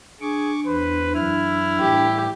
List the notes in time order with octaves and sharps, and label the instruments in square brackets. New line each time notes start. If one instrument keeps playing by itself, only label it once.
[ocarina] D4 [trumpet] G#4 [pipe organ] C#6 D6
[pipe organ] E2 C5 [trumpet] B4
[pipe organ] F#2 E3 F6 [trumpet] E4
[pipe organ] A2 E3 G3 [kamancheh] G4